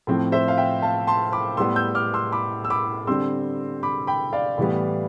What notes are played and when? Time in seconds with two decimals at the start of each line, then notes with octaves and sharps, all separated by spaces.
0.07 A2 F3 C4
0.32 C5 E5
0.48 F5
0.57 E5 G5
0.82 F5 A5
1.07 A5 C6
1.32 B5 D6
1.57 A2 G3 B3 C6 E6
1.76 E6 G6
1.95 D6 F6
2.14 C6 E6
2.32 B5 D6
2.65 E6
2.70 B5 D6
3.07 D3 G3 C4 C6 E6
3.83 B5 D6
4.07 G5 B5
4.33 D5 F5
4.58 A2 E3 G3 B3